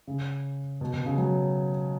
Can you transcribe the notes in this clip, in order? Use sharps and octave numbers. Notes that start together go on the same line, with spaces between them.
C#3
B2
B2
C#3
F#3